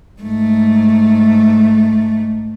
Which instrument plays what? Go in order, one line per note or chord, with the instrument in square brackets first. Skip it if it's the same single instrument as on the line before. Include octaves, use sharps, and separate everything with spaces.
[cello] G#2 A3